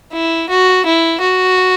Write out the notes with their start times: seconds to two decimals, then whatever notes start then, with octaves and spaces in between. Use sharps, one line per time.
0.13 E4
0.49 F#4
0.85 E4
1.21 F#4